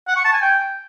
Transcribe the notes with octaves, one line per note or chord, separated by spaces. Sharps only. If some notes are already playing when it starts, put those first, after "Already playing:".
F#5
C#6
A5
G#5
G5